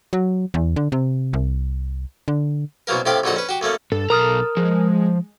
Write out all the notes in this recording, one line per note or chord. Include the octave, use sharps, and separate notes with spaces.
F#3
E2
D3
C3
C2
D3
C2 B2 F#3 A#3 A#4
A2 C3 G4 F5 B5 D6
A#1 D3 F#3 D#4 F#5
C#4 B4
F#4 G4
F#2 A3 A#3 C#4
G2 A4
B1 A#4 A#5 D#6 F6
F3 G#3